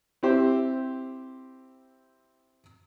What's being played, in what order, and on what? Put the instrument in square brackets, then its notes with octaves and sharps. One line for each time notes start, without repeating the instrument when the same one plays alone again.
[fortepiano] C4 E4 G4 C5